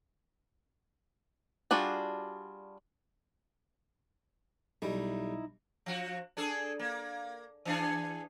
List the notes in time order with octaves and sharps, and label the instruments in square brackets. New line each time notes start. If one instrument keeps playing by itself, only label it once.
[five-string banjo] G3 D4 F4 F#4 G#4
[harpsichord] B1 G3 [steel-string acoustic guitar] D#4 E4
[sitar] F3 F#4
D4 G#4 A4
A#3
E3 D4 G#4